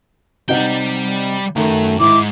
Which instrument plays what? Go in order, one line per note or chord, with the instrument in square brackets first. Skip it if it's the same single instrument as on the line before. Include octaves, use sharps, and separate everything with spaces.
[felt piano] C3 D#4 F#5 [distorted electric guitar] G3 G5
[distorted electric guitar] F#2 [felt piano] D#3 [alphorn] A3
[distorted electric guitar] C#2 G#2 [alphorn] E4 [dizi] D6